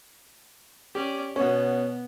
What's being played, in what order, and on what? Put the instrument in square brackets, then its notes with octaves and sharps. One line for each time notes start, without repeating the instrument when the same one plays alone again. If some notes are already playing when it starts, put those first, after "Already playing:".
[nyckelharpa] C#4 D5 [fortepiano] G4
[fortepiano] B2 C#4 [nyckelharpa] B3